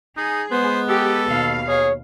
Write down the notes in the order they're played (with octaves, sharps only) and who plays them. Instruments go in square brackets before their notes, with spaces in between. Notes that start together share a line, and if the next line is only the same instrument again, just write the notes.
[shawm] D#4 [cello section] G#4
[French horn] G#3 [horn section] B3 [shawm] C5
[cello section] G4 [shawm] A4
[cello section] D#2 B2 F5
[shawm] G#4 [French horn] C#5